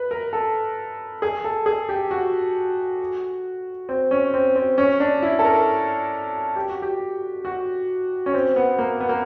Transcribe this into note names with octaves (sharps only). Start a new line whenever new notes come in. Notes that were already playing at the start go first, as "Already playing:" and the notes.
Already playing: B4
A#4
A4
G#4
A4
G#4
G4
F#4
C4
C#4
C4
C4
C#4
D4
E4
A4
A#4
G4
F#4
G4
F#4
C#4
C4
B3
A#3
B3
A#3